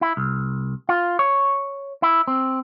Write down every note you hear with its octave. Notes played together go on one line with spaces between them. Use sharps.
E4
C2
F4
C#5
E4
C4